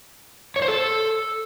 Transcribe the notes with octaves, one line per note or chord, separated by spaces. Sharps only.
C#5
C5
A4